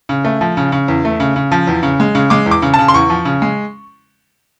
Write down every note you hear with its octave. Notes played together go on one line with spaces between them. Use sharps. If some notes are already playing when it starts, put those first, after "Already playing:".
C#3
A3
F3
C#3
C#3
E2
A3
C#3
C#3
F3
E2
C#3
G#3
C#3
G#3 D6
E2
D6
C#3
A5
C#3
C6
E2 C#6
F3
C#3
G#3